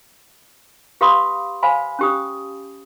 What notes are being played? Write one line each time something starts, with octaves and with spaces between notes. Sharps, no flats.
G4 B4 F5 B5 C6 D#6
C5 F5 F#5 G#5 B5
C#4 G4 D#6